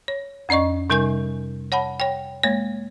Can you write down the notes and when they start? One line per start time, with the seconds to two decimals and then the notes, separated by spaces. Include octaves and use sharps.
0.08 C#5
0.49 F2 C#4 D5 D#5 C#6
0.90 C3 G3 D#4 A#4 G#5 G6
1.72 C#5 F#5 A5 B5
2.00 C#5 G5
2.43 G#3 A#3 C#5